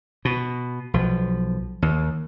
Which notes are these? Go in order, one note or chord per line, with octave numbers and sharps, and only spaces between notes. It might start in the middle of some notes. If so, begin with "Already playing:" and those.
B2
B1 F3
D#2